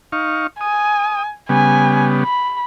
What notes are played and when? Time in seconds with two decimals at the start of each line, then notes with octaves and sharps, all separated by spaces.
0.12 D#4 F5 C#6
0.61 G#5 D#6
1.49 C#3 G3 B3 G#5
2.24 B5